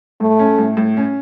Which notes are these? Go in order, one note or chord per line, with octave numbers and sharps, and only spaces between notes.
A2 A3
C#4
A2
A2
C#4